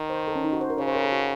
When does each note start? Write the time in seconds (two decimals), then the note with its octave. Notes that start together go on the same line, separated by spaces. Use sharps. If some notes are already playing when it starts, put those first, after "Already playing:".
Already playing: D#3
0.10 C5
0.28 A4
0.36 C#4
0.44 D#4
0.53 F#4
0.61 C5
0.70 A#4
0.78 C#3 C#5
0.87 C5
0.95 A#4
1.04 A4
1.12 F#4